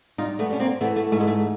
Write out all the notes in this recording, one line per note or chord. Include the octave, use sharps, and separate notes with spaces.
G3 D#4 F4
A3 B3
G3 C#4
A#3 C4
E3 A3 B3
A3
G#2 A3
G#3
A3